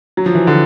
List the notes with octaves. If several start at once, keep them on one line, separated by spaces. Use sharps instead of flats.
F#3
F3
E3
D3